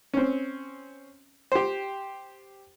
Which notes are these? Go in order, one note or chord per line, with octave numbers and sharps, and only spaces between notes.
C4 C#4
G4 C5